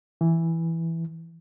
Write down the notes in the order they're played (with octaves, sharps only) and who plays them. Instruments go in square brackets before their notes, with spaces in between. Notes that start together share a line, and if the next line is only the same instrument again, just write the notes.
[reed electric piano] E3